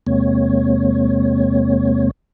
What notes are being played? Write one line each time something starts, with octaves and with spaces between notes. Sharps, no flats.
E2 C3 G#3 A#3 C4 C#5